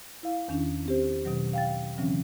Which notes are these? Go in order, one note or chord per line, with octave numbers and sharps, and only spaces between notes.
E4 F5
E2 D#3 C#4 D4
C4 G4 C5
B2 D#3 F#3
F5 G5 A6
C#3 E3 F#3 C4 C#4